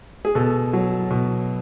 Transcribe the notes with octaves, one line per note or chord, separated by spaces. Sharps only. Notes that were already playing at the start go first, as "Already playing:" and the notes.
G#4
B2 A4
F#3
B2